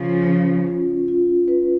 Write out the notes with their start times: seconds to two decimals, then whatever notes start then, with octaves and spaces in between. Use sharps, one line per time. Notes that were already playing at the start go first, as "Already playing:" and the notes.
Already playing: C#3 F3 F4
0.27 C#4
0.67 F4
1.08 F4
1.48 B4